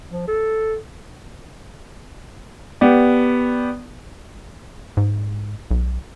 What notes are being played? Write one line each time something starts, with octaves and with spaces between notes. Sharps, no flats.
F3
A4
B3 G4 D5
G#2
B1